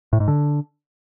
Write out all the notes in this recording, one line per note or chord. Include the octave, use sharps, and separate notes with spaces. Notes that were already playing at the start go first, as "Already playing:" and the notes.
A2
G#2
D3